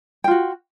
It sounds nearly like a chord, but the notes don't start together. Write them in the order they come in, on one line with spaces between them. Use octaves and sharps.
G5 F4 F#4